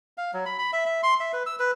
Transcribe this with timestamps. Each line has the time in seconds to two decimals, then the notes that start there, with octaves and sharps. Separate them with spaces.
0.18 F5
0.33 F#3
0.46 B5
0.59 B5
0.73 E5
0.86 E5
1.03 C6
1.20 E5
1.33 B4
1.46 E6
1.59 B4